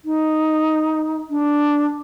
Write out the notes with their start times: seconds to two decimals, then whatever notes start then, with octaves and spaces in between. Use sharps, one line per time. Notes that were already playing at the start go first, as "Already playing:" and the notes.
0.05 D#4
1.30 D4